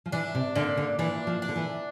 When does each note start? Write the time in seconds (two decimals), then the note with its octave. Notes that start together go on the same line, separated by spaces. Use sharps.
0.06 F3
0.12 E3 D4
0.35 C3
0.55 A#2 D3
0.77 D3
0.99 E3 D4
1.27 F3
1.42 D4
1.49 D3
1.56 E3